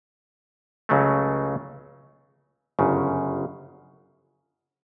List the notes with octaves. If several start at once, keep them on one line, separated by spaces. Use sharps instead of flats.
C#2 C#3 F#3 A3
G1 F#2 C#3